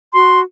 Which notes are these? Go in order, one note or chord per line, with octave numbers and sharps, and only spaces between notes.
F#4 C6